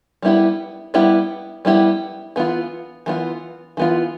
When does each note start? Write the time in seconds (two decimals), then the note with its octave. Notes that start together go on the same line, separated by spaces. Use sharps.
0.22 G3 B3 E4 G4
0.94 G3 B3 E4 G4
1.65 G3 B3 E4 G4
2.36 E3 B3 F4
3.06 E3 B3 F4
3.77 E3 B3 F4